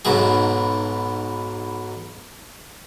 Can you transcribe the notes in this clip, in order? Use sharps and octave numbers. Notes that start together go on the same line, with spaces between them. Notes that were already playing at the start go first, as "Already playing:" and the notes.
B1 G#2 B2 G#4